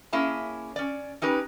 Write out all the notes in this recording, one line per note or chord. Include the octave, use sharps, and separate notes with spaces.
A#3 C#4 E4 G#4 A5
C#4 D5
C#4 D#4 G4 B4